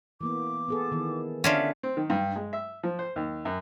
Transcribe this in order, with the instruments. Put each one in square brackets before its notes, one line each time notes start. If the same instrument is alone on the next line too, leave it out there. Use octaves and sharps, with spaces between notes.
[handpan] E3 A#3 B3 [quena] D6
[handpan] B3 G#4 A4
D#3 E3 B3
[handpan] D3 F#5 [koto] C#4 D4 F4 [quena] E5
[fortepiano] C4
D#3
G2
G#3
E5
F3
C5
D#2
F#2